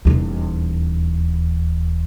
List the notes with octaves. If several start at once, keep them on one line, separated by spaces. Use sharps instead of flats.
D#1 E2